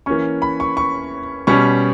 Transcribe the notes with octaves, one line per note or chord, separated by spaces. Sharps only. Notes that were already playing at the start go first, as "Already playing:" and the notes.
E3 A#3 C#4 C#6
B5
C#6
C#6
B2 G3 C#4 C#6